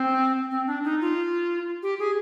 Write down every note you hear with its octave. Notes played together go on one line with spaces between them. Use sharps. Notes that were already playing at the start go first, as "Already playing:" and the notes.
Already playing: C4
C4
D4
D#4
F4
G4
G#4